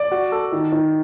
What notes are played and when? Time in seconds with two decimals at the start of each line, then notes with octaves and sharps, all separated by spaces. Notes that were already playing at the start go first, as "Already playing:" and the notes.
Already playing: D5
0.12 F#4
0.32 A4
0.52 D#3
0.72 D#3